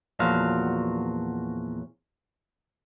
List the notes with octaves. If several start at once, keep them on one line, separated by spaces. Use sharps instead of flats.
E2 A#2 F3 F#3 F#4 F5